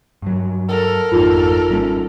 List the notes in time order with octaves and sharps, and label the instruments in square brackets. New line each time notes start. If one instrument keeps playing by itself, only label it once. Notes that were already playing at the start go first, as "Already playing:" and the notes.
[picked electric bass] G2 F#3
[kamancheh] A4 A#4
[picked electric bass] G#1 F2 G#2 [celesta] D#4 F4
[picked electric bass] G#1 G3 C#4